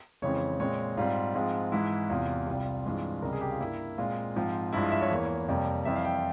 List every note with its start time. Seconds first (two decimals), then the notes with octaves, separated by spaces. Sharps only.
0.22 F2 C#3 E3 G#3 C4 C#5
0.60 A#2 G#3 C4 C#5
0.97 G#2 G3 C4 F4
1.34 G#2 F3 G#3 C4
1.72 G#2 E3 G#3 E4
2.10 E2 C3 E3 F4
2.47 C2 C3 G3 C4
2.85 G2 E3 G#3 C4 F4
3.22 C#2 C3 G3 A#4
3.33 G#4
3.41 G4
3.52 F4
3.60 G2 G3 A#3 E4
3.98 A#2 G#3 C4 F4
4.36 G#2 F3 C4
4.73 G2 F3 G#3 E4
4.83 F4
4.92 E5
5.01 C#5
5.11 E2 E3 A#3
5.48 F2 C3 G3 A#3
5.85 F2 E3 G3 C4 E5
5.96 F5
6.05 G5